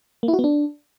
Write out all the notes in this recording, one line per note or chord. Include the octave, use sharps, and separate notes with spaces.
A#3
E4
F#4
B3
D4